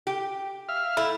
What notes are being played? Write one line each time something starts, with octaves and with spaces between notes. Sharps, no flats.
G4
E5 F5 F6
A3 E4